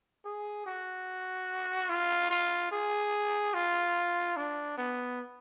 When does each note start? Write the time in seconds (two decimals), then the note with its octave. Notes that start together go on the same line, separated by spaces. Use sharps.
0.25 G#4
0.66 F#4
1.89 F4
2.30 F4
2.72 G#4
3.54 F4
4.36 D4
4.77 B3